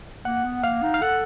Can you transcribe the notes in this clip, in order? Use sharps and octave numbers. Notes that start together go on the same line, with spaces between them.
A#3 F#5
B3
A#3 F5
D#4
F5
A4 F#5